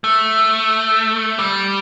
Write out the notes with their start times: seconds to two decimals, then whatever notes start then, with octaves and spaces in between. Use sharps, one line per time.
0.04 A3
1.39 G3